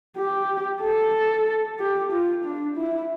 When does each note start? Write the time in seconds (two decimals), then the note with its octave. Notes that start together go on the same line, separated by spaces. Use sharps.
0.17 G4
0.82 A4
1.79 G4
2.12 F4
2.44 D4
2.77 E4